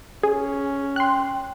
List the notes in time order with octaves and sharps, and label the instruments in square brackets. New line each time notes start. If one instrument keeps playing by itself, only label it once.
[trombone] C#4 [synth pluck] G#4
[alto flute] G5 [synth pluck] C6 F#6